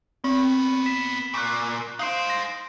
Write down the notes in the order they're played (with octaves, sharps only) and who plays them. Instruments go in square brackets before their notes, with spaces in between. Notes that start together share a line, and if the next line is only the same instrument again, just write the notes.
[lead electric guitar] A#2 B3 [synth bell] C4
[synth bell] B6 E7
[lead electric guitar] A#2 [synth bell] C#6 F#6
[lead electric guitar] D#4 C5 [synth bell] F5 C7 D7
[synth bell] A#6